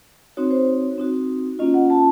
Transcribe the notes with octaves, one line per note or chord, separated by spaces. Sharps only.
C4 D#4 F#4 C#5
C5
C#5
C4 D#4 F#4
A#3 C#4 F4 D#5
F#5
A5